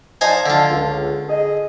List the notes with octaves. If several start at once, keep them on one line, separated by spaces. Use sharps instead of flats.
D#4 C5 D5 F5 G#5 A5
D3 F4
C#2
G#4 D#5